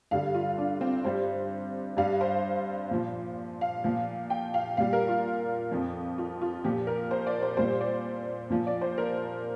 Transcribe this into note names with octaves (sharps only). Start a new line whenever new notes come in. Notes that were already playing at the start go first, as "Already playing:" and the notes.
G2 D3 G3 F5
F4
D4
C4
G2 G3 C5
G2 G3 F5
C5
A#2 F3
F5
A#2 F3
G5
F5
A#2 G3 F5
A#4
F4
F2 F3
F4
F4
A#2 F3 G4
A#4
C5
D5
C5
A#2 G3 C5
D5
A#2 F3
D5
C5
A#4